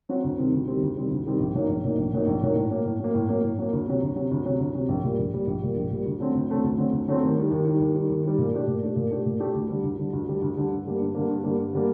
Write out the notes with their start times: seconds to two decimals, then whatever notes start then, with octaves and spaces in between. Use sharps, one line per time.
0.09 F#3 C4 F#4
0.24 D2
0.38 C3 D#3 G3 C4
0.53 D2
0.67 C3 D#3 G3 C4
0.82 D2
0.96 C3 D#3 G3 C4
1.11 D2
1.25 C3 D#3 G3 C4
1.40 A#1
1.54 A#2 F#3 A#3 D#4
1.68 A#1
1.84 A#2 F#3 A#3 D#4
1.98 A#1
2.12 A#2 F#3 A#3 D#4
2.27 A#1
2.42 A#2 F#3 A#3 D#4
2.56 A2
2.71 F#3 A#3
2.85 A2
3.00 F#3 A#3
3.15 A2
3.29 F#3 A#3
3.43 A2
3.58 F#3 A#3
3.73 D2
3.87 C3 F#3
4.02 D2
4.16 C3 F#3
4.31 D2
4.45 C3 F#3
4.60 D2
4.75 C3 F#3
4.89 A#1
5.04 A#2 G3
5.19 A#1
5.33 A#2 G3
5.47 A#1
5.62 A#2 G3
5.76 A#1
5.90 A#2 G3
6.06 D2
6.20 D3 F#3 A3 C4
6.35 D2
6.49 D3 F#3 A3 C4
6.64 D2
6.77 D3 F#3 A3 C4
6.92 D2
7.08 D3 F#3 A3 C4
7.22 D#2
7.36 D#3 G3
7.51 D#2
7.65 D#3 G3
7.79 D#2
7.94 D#3 G3
8.09 D#2
8.23 D#3 G3
8.38 A#2
8.53 A3 D4 G4
8.67 A#2
8.82 A3 D4 G4
8.96 A#2
9.11 A3 D4 G4
9.25 A#2
9.39 A3 D4 G4
9.54 D2
9.69 D3 G3
9.83 D2
9.98 D3 G3
10.13 D2
10.27 D3 G3
10.42 D2
10.57 D3 G3
10.71 G2
10.85 D3 G3 A#3
11.00 G2
11.15 D3 G3 A#3
11.29 G2
11.44 D3 G3 A#3
11.57 G2
11.73 D3 G3 A#3